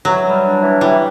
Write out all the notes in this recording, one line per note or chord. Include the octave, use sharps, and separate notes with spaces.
E3 F#3
G3
D4
E3
E3 G3